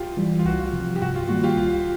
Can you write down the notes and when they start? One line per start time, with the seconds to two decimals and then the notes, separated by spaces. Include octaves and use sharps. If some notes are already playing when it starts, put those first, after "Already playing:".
Already playing: F4 G4
0.17 E3 G3
0.39 F4
0.45 C2 F#4
0.59 F4
0.73 C3 F3
0.95 G4
1.01 G2 F#4
1.15 F4
1.28 D#3 G3 A#3 F#4
1.43 F4 G4
1.57 C2 F4